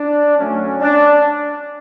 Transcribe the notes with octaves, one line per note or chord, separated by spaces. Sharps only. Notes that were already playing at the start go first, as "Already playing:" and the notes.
Already playing: D4
D2 D3 F#3 A3 C#4
D4